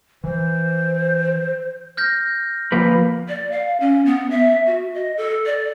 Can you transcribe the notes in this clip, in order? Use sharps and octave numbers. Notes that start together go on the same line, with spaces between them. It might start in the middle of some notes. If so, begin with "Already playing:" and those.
E3 C5
F6 G6 A#6
F3 A#3 B4
D5
F5
C#4
B3
E5
F#4
D#5
A4
D5